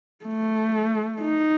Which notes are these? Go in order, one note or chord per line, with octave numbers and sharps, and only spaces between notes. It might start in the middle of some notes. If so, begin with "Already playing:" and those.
A3
D#4